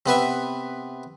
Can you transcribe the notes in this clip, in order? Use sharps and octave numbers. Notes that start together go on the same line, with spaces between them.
C3 B3 B4 E5